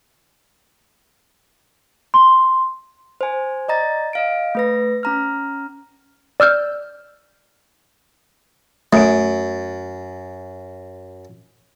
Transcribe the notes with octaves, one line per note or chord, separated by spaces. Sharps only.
C6
C5 G#5
D5 D#5 A#5 A6
D#5 F5 D7
A3 B4 A#6
C#4 A#5 F6
D5 E6 F6 G6
F#2 A3 D7